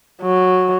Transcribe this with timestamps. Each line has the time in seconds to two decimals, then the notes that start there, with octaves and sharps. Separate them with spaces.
0.22 F#3